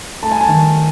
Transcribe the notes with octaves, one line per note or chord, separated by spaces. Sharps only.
A3 A5
G#5
A5
D#3